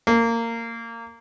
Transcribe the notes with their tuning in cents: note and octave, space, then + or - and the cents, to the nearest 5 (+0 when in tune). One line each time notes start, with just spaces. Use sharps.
A#3 -20